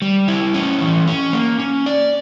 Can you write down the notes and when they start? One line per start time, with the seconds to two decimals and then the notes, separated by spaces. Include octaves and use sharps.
0.02 G3
0.28 E4
0.54 C#4
0.81 E3
1.07 C#4
1.33 A#3
1.59 C#4
1.86 D5